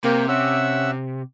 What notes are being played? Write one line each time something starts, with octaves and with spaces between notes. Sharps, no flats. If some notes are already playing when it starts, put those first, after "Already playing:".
C3 A#3 G5
C#4 E5 F#5 E6